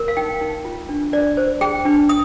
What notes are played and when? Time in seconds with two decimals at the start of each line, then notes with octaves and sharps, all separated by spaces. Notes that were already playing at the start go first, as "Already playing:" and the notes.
Already playing: A#4
0.08 F5
0.17 D#4 G5
0.41 D#4
0.65 F4
0.89 D4
1.13 D4 D5
1.37 C5
1.61 G#4 G5
1.85 D4
2.09 D#6